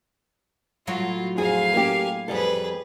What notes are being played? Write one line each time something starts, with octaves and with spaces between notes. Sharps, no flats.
A2 F#3 F4 C#5
F2 G#4 F5 G#5
A#3 C#4 G4
F2 G3 G#4 A4 B4